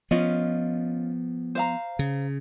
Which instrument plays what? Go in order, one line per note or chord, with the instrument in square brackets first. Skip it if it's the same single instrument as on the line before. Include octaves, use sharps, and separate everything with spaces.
[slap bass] F3 B3 [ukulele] C#4 F4 D#5
[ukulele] C5 F5 A#5
[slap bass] C#3